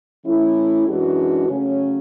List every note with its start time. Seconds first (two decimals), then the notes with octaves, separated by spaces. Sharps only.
0.25 E3 A3 C#4 E4
0.86 F#2 E3 G#3 D4 F#4
1.48 C#3 F#3 A3 C#4